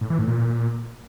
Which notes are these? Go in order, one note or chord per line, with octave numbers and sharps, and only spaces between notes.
A2
E3
A2
A#2